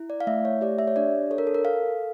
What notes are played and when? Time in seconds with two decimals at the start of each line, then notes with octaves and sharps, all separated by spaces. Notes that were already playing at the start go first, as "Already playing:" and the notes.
Already playing: E4
0.10 D5
0.20 F5
0.27 A3 E5
0.45 C#5
0.61 G4 D5
0.79 E5
0.87 C#5
0.96 D4 D5
1.30 A4 C#5
1.38 A#4
1.47 A4
1.55 A#4
1.65 A4 F5